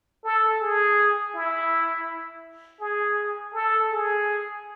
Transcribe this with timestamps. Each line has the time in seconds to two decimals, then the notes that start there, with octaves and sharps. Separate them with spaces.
0.24 A4
0.61 G#4
1.35 E4
2.80 G#4
3.54 A4
3.91 G#4